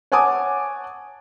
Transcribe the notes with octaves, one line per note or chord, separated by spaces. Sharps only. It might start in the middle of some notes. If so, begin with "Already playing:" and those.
C#5 F#5 G#5 A5 D6 D#6